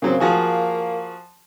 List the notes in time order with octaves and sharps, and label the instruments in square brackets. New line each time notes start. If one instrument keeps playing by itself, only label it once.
[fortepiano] C#3 F#3 C4 [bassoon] A#3
[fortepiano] F3 F#4 G#4